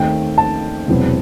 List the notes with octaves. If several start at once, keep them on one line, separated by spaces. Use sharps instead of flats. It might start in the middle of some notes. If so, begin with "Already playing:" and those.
Already playing: D#2 D#3 A3 C4 D#4 G5
A5
E1 E2 C3 F#3 B3